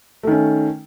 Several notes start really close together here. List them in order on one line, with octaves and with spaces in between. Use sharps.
A3 D#3 C#4